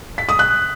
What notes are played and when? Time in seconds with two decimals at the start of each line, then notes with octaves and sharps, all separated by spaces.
0.18 B6
0.29 D#6
0.39 F#6